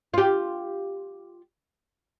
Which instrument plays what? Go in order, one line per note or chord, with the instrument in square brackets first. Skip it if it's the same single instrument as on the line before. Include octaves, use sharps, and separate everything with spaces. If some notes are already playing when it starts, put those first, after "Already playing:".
[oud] F4 G4